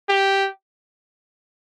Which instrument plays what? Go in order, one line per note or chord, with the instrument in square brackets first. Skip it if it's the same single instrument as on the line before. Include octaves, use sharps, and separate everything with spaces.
[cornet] G4